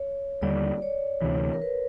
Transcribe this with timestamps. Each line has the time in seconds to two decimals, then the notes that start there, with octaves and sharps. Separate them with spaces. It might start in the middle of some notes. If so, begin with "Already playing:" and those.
Already playing: C#5
0.42 D#2 D3 G3 D5
0.82 C#5
1.22 D2 C3 E3
1.53 A#4
1.62 B4